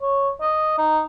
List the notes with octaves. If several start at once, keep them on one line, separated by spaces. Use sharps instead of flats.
C#5
D#5
D#4